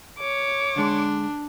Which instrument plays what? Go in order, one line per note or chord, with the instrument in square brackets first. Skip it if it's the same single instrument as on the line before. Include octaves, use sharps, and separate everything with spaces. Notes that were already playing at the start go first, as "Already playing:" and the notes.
[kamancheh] C#5 D6
[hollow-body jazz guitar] D3 G#3 [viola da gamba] D4